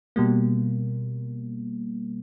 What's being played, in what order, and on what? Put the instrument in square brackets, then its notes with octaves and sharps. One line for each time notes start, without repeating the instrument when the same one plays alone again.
[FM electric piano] B2 G3 A#3